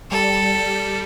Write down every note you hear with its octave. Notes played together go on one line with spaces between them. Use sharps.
G3 A4